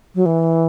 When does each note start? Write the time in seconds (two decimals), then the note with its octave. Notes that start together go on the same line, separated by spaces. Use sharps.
0.15 F#3
0.26 E3